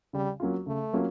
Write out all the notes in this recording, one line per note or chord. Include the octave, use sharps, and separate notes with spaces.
C#3 G3
F#3 A#3 C#4 F4
C#3 A3
F#3 A#3 C#4 F4